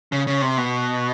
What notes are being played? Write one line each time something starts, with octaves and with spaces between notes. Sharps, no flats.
C#3
C#3
C3
B2